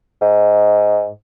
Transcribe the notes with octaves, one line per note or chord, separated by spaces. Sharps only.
G#2